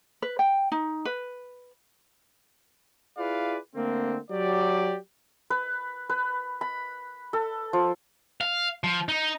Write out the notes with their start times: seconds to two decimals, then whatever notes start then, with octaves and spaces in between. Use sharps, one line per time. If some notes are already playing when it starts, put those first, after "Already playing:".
0.22 B4
0.39 G5
0.72 D#4
1.05 B4
3.18 E4 F4 G#4 B4 D5 F5
3.75 D3 A3 A#3 C4
4.31 F#3 G4 D5
5.50 B4
6.10 B4
6.61 B5
7.33 A4
7.73 F3
8.41 F5
8.84 F3
9.09 D#4